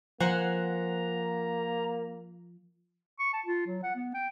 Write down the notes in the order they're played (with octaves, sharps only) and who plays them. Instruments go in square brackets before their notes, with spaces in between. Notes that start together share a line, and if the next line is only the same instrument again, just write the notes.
[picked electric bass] F3 [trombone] A#3 [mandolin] C5 F#5 G#5 [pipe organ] A#5
[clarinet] C#6
A5
F4
F#3
F#5
B3
G5